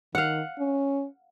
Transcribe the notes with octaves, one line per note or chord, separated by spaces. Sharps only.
D#3 F5 F#5
C#4